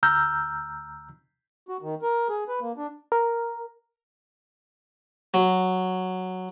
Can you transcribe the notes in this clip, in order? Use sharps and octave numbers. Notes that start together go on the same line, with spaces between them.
D2 A#5 E6 F6 G6
F#4
D#3
A#4
G#4
B4
A#3
D4
A#4
F#3